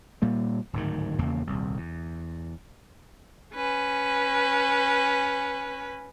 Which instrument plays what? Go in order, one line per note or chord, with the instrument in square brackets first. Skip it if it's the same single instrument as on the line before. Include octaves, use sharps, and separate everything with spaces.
[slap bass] A#2 G3 A#3
D1 G#2 D#3
D#1 E2 C#3 A#3
D#1 C2
E2
[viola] C#4 B4